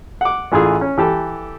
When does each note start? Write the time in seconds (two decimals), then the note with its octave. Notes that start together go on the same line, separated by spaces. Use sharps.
0.21 F#5 D6
0.52 A1 E3 F4 G#4
0.81 C#4
0.98 E3 G4 A4